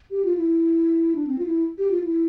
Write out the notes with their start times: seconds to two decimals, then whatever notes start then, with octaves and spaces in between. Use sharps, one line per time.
0.11 G4
0.25 F4
0.37 E4
1.15 D4
1.27 C4
1.39 F4
1.46 E4
1.78 G4
1.91 F4
2.04 E4